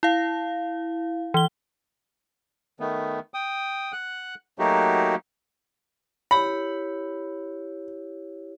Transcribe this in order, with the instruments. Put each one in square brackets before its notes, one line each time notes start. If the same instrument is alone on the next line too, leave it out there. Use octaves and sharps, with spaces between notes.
[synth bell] E4 F5
E3 G7
[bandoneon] D#3 A3 B3
G5 D#6
F#5 F#6
F#3 A3 A#3 D#4 F#4 G4
[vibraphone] E4 G4 C#5 [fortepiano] B5